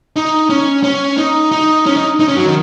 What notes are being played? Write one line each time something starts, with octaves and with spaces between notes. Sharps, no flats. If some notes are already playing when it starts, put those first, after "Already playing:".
D#4
C#4
C#4
D#4
D#4
C#4
D#4
D#4
C#4
F#3
D#3